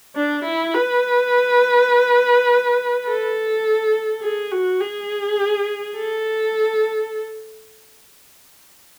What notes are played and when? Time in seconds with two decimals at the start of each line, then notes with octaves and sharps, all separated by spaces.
0.15 D4
0.45 E4
0.74 B4
3.06 A4
4.22 G#4
4.52 F#4
4.80 G#4
5.97 A4